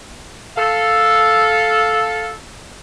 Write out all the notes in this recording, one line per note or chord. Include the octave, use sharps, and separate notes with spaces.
A4 F5